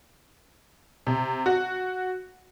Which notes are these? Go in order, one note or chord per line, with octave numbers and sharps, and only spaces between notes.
C3
F#4